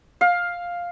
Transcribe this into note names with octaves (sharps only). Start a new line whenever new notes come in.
F5